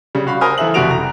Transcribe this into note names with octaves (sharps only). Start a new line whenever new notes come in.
C#3 G3
F#4 F5 B5
A#4 C5 G#5 B5 D#6 F6
E3 A4 E5 F#7
F#1 F2 G3 F#4 D7 F7
A#5